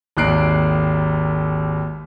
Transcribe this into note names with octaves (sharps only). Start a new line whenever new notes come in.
G#1 D#2 D#4 F#6 C7 D7